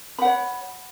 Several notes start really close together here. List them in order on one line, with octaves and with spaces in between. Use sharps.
B5 F#5 C#5